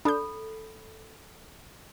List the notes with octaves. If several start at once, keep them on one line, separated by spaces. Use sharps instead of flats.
D4 A4 B5 G6